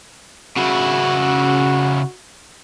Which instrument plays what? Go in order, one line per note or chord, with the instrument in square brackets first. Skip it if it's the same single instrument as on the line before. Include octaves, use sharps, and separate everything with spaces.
[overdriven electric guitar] C#3 E4 [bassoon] F#4